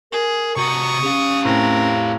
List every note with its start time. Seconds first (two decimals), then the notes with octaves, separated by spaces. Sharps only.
0.12 G#4 A#4
0.57 C3 F#4 A#5 C#6 D#6
1.03 C#4 G4 F5
1.45 A2 C4 A#4